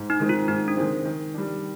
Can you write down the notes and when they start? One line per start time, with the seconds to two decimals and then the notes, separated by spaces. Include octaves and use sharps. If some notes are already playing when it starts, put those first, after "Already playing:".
Already playing: G#2
0.10 D#4
0.20 D#3 G#3 C4
0.29 F4
0.48 G#2 D#4
0.68 D4
0.77 D#3 G#3 C4
1.05 D#3
1.34 G3 D4